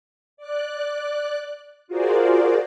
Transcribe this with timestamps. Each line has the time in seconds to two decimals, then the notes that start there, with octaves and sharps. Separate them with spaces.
0.37 D5 F#6
1.88 F4 F#4 G#4 A#4 C5 D5